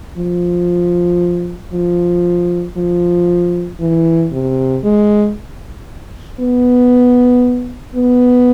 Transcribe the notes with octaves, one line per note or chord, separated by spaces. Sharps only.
F3
F3
F3
E3
C3
G#3
B3
B3